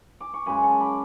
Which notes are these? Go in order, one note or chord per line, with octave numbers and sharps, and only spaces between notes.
D6
C#6
F#2 C#3 G#3 G#5 B5
A5 C#6
B5 D6